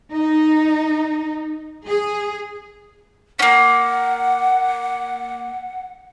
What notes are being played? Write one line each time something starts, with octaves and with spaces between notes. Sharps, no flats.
D#4
G#4
A#3 C#4 F#5